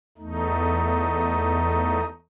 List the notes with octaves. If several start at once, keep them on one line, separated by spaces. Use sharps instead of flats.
E2 A3 D#4